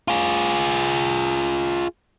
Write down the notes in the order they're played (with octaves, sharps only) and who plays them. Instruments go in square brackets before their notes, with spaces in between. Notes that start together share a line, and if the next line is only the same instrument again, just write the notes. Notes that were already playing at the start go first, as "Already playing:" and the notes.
[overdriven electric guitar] F4 G#4